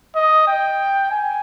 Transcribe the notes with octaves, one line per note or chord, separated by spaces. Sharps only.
D#5
G5
G#5